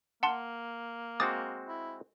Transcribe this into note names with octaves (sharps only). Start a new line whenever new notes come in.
A#3 F#5 A5 C6
G#3 C4 F#4 D6 D#6 A6
E4